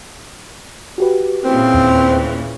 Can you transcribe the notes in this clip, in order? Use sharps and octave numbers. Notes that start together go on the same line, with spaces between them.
F#4 G4 B4
A#2 C#3 E3 C4
D#2